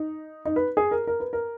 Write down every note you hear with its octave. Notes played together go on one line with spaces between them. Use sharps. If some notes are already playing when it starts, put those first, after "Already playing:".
Already playing: D#4
D#4
B4
G#4
A#4
A#4
B4
A#4